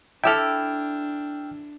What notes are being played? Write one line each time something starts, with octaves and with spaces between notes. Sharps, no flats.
D4 E4 G4 A4 G5 E6 F6